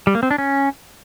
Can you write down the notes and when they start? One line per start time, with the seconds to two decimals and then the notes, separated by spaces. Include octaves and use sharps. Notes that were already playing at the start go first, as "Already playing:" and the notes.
0.07 G3
0.15 A#3
0.23 C4
0.31 D4
0.38 C#4